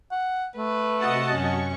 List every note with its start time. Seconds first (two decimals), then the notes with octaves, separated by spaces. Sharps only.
0.11 F#5
0.57 A3 B4
1.00 C3 F#4 D#5 F#5 A5
1.31 F#2 C#4 C#6 C#7